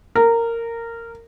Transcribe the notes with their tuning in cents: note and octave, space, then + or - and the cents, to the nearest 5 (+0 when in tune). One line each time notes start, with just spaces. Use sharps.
A#4 -15